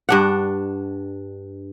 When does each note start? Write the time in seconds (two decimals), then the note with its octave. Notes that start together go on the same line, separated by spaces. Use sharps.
0.09 G2 D4 F#5